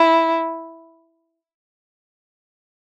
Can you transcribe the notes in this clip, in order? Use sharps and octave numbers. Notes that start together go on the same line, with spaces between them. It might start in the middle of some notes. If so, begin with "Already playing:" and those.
Already playing: E4